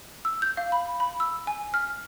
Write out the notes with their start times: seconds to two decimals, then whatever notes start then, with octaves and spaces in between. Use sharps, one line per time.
0.25 E6
0.42 G6
0.57 F5
0.72 B5
1.00 B5
1.20 E6
1.47 G#5
1.74 F6